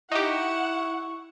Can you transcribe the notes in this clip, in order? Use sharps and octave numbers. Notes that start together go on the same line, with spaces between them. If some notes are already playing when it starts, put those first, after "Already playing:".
D#4 E4 G4 F#5 C#6